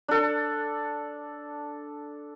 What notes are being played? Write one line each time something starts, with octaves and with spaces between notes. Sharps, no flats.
D4 A4